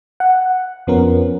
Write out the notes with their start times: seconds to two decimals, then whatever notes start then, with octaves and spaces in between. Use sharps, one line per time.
0.20 F#5
0.87 F2 F3 B3 C#4 A#4